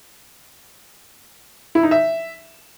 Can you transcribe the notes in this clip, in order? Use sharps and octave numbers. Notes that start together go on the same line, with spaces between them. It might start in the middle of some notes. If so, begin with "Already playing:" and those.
E4
D#4
E5